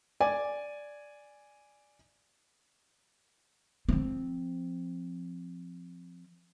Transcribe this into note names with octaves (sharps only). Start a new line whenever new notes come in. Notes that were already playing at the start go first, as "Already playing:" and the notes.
D5 G#5
F3 C4